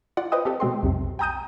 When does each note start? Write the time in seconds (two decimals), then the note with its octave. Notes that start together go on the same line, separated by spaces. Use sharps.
0.17 F4 D5 F#5
0.32 B4 C5 D#5 G5 D#6
0.45 C4 G4 A4
0.60 B2 G#3 C4 C6
0.83 B1 F2 C3
1.19 G5 G#5 A#5 D#6 G6 D#7